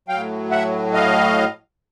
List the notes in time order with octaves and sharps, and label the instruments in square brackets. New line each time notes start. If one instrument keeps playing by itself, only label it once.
[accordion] A2 F#3 F5 G5
E5 F#5
D#5 F5